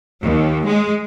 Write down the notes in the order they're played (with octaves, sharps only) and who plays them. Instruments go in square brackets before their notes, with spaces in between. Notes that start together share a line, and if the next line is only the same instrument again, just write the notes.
[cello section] D#2
G#3